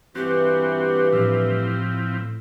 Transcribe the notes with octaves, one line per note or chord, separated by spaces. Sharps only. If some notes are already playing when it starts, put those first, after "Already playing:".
G2 E3 C4 F#4 G4
A2 F3 C4 E4